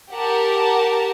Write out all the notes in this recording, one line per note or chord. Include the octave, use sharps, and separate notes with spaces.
G4 A#4 F#5 A5